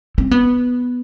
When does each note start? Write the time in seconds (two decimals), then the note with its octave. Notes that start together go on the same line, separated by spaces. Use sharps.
0.18 C4
0.31 B3